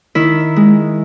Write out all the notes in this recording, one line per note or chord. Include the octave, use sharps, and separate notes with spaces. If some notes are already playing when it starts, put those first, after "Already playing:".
D#3 E4 E5
G#3